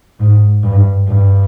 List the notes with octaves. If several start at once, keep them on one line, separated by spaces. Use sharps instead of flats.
G#2
G2
G2